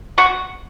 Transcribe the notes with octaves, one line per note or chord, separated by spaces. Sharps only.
F#4